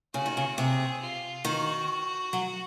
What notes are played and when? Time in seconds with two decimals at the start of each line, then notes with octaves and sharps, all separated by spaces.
0.14 C#3 F#4
0.26 D#3
0.37 C#3
0.57 C3 G#4
1.02 F4
1.45 D#3 F#4
2.33 F#3